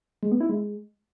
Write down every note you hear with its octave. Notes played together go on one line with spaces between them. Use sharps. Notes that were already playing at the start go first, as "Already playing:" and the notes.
G#3
B3
E4
G#3